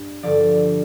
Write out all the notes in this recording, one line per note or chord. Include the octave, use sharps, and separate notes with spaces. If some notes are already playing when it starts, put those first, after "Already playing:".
Already playing: G2
G2 D3 F3 D5